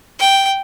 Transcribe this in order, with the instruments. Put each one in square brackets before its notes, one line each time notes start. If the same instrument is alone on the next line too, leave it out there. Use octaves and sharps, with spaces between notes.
[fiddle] G5